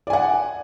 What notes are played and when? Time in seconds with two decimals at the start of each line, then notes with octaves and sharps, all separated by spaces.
0.07 D5
0.10 G#5
0.13 F#5